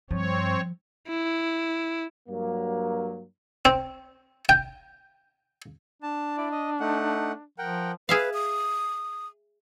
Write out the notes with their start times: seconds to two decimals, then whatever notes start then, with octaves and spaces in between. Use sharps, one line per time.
0.11 G2 F3 C4 C#5
1.08 E4
2.29 G2 F#3 A#3
3.65 C4
4.49 G5
6.02 D4 A5
6.38 E4 D5
6.52 D#5
6.80 A3 D#4 F#5
7.58 F3 A#4 F#5 G5
8.09 G#4 B4 E5 F5
8.33 D#6